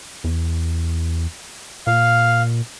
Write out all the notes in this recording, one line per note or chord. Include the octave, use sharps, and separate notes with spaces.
E2
A#2 F5